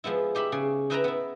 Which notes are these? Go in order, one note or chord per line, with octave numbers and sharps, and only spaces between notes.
F3 G#3 B3 E4
D#4 G4 E5 B5
C#3 G#4
D#4 E4 B4 E5 G5 A#5
B3 E4